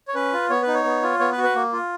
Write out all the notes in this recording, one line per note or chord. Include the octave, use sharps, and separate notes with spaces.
C#5
C#4 B4
F4
B3 C#5
D#4 B4
C#5
B3
F4
B3 C#5
B4
F#4
B4
A#3
F4